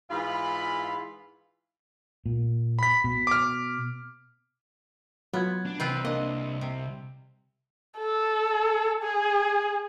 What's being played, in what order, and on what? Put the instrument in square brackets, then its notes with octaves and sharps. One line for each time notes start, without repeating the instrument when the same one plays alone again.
[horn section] G#2 E3 F4 F5 B5
[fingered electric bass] A#2
[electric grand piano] B5 B6
[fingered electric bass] B2
[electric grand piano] D6 F6
[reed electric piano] F#3 F4 G#6 [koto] B3
[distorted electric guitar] D4
[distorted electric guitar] C2 [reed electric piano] E3 [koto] C4 F4 B4
[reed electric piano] A#3 D4 [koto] D#5
[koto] C3
[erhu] A4
G#4